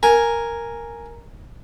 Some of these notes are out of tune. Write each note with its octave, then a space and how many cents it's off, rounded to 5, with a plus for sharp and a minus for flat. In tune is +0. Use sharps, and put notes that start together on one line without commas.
A#4 +0 G#5 +0